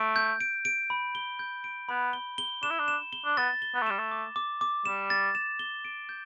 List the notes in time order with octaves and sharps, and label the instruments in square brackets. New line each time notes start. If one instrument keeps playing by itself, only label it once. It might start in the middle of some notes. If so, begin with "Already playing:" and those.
Already playing: [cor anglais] A3 [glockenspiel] D7
[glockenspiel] G6
D7
D7
B5
G7
G6
D7
[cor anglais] B3 [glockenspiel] B5
[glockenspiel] G7
G7
[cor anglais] D4 [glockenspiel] E7
[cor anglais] E4
D4
[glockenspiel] E7
G7
[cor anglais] D4
[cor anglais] B3 [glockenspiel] A6
[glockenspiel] G7
[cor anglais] B3
A3
[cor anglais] G3 [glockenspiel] E7
[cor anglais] A3
[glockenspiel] D6
D6
D6
[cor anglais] G3 [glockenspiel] E7
[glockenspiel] A6
E7
G7
D7
G6